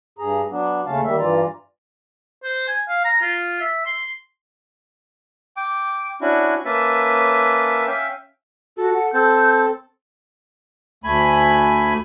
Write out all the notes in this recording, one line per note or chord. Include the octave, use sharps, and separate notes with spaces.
G2 G#4 A#5
F#3 B3 D4
D#2 C#3 A3 C#4 F5 A5
D#3 G3 A#3 E5
G2 E3 F4 D5 A#5
C5
G#5
F5
A#5
F4
E5
C6
G5 D6
C#4 D4 E4 F#4
A#3 C#4 B4 E5 A5
C#4 E5 F5 G5
F#4 A4
F#5
C4 A4 G6
D2 A3 G#5 B5